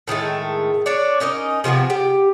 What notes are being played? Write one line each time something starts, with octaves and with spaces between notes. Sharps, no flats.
A2 D#3 G#3 A3
D4 C#5 D5
C#4 D#4 A#4 D#5
C3 F3 B3 G#5
G4